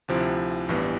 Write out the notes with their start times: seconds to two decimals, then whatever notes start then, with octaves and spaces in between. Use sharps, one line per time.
0.08 D2 C3 F3 C4 E4
0.68 A1 G2 E3 G3 B3